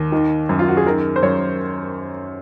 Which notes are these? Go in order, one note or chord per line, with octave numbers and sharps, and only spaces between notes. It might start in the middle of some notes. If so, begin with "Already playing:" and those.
Already playing: D#2
D#3
F#2
F4
F#4
G#4
D#3 A#4
C5
F#2 C#5